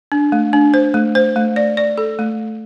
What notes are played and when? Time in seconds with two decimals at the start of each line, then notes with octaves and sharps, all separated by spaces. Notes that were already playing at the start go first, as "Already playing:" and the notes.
0.12 D4
0.32 A3
0.53 D4
0.74 C5
0.94 A3
1.15 C5
1.36 A3
1.56 D5
1.77 D5
1.98 A4
2.19 A3